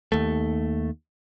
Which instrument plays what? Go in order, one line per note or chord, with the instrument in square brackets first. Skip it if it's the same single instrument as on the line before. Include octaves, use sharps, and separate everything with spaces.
[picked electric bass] D#2 A3